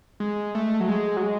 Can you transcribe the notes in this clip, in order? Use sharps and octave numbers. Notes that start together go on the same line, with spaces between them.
G#3
A3
F#3
G#3
F#3
G#3